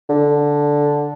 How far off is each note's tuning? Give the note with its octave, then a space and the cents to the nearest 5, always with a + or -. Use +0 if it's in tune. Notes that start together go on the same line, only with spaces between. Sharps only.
D3 -5